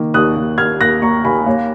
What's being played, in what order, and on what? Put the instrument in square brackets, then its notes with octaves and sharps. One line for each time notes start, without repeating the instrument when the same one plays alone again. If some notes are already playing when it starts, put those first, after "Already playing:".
Already playing: [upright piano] D#3 A#3
D#2 D#6 F#6
D#2
D#2 F6 G#6
D#2 F#6 A#6
A#3 A#5 C#6
D#2 G#5 B5
A#3 C#5 F5